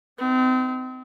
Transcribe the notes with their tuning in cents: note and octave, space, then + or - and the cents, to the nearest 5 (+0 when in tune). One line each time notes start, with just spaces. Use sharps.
C4 -35 D#4 +15